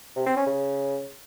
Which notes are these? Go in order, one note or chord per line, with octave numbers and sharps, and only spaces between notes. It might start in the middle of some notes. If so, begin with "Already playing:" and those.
C3
C4
C#4
C#3